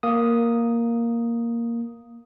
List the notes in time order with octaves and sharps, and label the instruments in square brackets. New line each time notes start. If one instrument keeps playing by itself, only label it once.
[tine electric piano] A#3 D#6